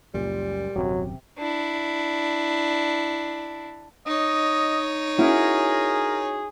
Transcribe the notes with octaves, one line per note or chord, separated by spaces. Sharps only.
C#2 F#2 A#2 G3
D#1 F#2 C3 F#3 G4
D4 E4
D#4 C#5 D#5
C#4 E4 F#4 G#4 A#4